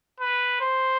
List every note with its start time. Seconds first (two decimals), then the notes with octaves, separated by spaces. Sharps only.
0.20 B4
0.61 C5